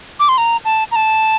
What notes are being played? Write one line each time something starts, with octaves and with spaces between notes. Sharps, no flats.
D6
C6
A#5
A5
A#5
A5